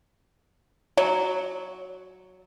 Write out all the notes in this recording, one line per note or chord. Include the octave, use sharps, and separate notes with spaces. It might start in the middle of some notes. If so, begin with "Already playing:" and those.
F#3 C#5